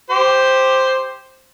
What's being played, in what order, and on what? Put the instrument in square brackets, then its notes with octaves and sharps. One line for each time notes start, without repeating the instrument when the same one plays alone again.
[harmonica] G4 C5